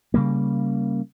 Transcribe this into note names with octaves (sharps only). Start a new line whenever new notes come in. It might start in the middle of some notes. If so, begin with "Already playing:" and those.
C#3 G3 A#3